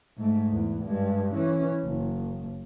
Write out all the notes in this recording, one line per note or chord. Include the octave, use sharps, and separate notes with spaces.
G#2 A3
E2
G2 G#3
E3 C#4
F#1